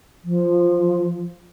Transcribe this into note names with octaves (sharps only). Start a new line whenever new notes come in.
F3